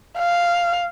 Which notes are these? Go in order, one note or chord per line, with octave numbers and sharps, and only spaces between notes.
F5